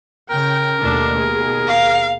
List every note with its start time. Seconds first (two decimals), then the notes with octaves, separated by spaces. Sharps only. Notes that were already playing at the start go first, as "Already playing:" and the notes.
0.30 C#3 A#4 G5
0.80 D#2 B2 A3 D4
1.19 G#4
1.68 F5